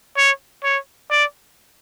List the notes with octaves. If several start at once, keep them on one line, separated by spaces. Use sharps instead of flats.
C#5
C#5
D5